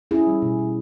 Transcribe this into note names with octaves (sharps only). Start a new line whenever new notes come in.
C#4 E4 G#4
G3
B2
B2